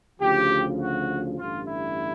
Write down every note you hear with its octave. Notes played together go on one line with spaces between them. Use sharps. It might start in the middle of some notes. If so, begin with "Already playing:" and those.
D2 C#3 F3 G4
F#4
A1 G2 D3 F4
E4